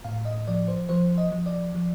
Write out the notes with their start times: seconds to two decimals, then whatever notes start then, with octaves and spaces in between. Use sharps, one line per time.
0.04 A2 F5
0.25 D#5
0.48 F3 D5
0.68 C5
0.89 F3 C5
1.18 D#5
1.32 F3
1.46 D5
1.74 F3